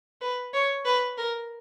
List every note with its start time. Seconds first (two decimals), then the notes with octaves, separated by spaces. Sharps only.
0.21 B4
0.54 C#5
0.85 B4
1.17 A#4